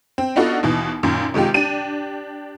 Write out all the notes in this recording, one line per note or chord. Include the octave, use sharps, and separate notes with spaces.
C4
B3 D4 D#4 F4 F#4 A4
D#2 B2 E3
F#2 A#2 D#3
C3 D#3 G#3 F4 G4
D4 G4 D#7